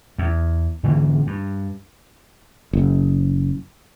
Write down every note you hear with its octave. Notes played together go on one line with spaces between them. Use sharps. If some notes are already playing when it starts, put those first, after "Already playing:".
E2
G#2 D3 E3 A#3
G2
F#1